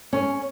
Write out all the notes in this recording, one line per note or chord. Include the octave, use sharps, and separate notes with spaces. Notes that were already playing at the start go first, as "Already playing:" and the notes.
C#4